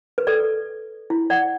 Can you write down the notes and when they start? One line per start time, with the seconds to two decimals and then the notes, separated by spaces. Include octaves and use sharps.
0.18 B4
0.27 A4 D5
1.10 E4
1.30 D5 F#5